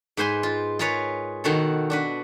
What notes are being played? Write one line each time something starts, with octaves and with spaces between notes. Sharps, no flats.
G#2 B4 C5 G#5 C6
F4
F4 G#4 A#4 B4 C#5
B2 D#3 F#4 A4
D4 F#4 B4